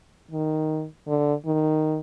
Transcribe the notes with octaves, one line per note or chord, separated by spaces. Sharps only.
D#3
D3
D#3